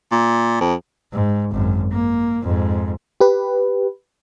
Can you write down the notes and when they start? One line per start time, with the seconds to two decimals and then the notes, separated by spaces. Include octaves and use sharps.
0.12 A#2
0.61 F2
1.12 G#2
1.52 G#1 F#2
1.92 A#3
2.42 F2 G#2
3.20 G4 B4